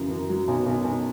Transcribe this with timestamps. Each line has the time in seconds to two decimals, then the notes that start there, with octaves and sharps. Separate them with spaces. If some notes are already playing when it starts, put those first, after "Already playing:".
Already playing: F#2 C#3 E3
0.10 F#2
0.29 F#3
0.48 B1
0.66 B1
0.84 B1